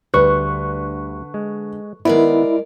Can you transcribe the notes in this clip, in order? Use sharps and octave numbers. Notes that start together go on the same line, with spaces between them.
D2 D3 G3 B4 C#6 F#6
G#3
D#3 G#3 B3 E4 A#4 D5